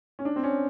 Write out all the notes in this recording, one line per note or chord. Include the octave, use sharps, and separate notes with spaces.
C#4
D4
C4
C#4